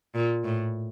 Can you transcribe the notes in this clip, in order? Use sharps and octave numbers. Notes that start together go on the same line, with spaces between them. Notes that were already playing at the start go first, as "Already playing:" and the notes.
A#2
A2